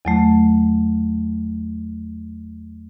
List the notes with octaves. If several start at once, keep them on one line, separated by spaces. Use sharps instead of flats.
E2 F#3 A3